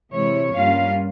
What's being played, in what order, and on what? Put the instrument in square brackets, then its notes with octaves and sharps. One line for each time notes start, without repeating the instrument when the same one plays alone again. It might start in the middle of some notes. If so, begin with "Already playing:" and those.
[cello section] C3 E3 G#3 E4 C#5
G2 G3 A#3 C#4 F4 F5